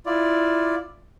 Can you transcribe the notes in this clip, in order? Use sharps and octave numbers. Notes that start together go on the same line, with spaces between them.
E4 F4 D5